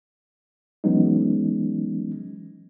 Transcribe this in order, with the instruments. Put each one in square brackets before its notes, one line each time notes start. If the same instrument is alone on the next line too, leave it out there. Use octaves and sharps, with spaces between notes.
[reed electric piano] E3 F#3 G#3 B3 C#4 D#4